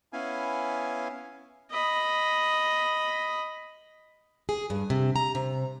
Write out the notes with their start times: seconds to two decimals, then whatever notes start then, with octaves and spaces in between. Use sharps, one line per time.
0.13 B3 C#4 E4 F5 G#5
1.71 D#5 B5
4.49 G#4
4.70 G2
4.90 C3
5.16 A#5
5.35 C3